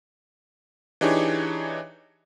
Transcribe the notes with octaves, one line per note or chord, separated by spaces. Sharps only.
E3 D4 D#4 G4 G#4 C#5